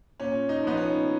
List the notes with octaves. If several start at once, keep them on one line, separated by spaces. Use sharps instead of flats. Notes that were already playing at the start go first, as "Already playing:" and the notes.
A#2 C#4
D#4
F3 B3 D#4
C#4